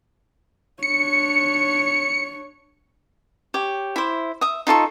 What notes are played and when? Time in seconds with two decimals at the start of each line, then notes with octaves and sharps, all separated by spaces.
0.83 D4 C#5 C#7
3.54 G4 C#5
3.96 E4 C5
4.41 E5 D#6
4.67 D#4 F4 A4 C#6